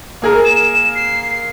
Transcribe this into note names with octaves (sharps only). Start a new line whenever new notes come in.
A#3 G#4 A#4
E7
C7